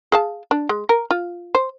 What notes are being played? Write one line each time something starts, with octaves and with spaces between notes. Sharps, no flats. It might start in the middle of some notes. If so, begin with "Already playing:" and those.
G#4 F5 A5
D4
G#3
A#4
F4
C5